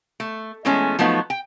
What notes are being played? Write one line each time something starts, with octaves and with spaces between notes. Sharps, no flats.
A3
E3 G#3 A3 B3 C#4
F3 F#3 A3 B3 D#4
G5